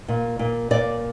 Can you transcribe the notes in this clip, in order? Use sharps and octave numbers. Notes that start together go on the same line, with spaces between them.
A#2
A#2
A#2 D5